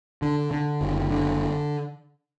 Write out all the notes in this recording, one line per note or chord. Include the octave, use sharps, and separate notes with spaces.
D3
D3
F#1
D3